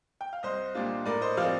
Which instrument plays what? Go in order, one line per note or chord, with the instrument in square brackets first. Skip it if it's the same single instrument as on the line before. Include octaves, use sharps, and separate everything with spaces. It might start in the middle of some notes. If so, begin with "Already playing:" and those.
[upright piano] G5
F5
C2 C5 D#5
A#2 G3 D4 F4
A2 A#4 D5
C5 D#5
F3 C4 F4 D5 F5